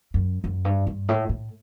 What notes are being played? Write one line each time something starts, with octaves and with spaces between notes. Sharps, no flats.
F#2
F#2
G2
G2
A2
A2